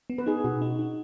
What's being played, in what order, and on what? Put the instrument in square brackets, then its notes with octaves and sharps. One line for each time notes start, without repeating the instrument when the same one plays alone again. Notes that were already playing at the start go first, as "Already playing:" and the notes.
[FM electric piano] B3
[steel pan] B4
[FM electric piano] D#4 [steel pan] G#4
[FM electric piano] B2 [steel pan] F#4
[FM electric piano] D#4
D#4